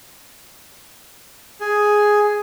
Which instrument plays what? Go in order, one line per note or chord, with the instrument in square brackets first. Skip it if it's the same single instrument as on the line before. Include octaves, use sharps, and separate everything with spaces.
[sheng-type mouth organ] G#4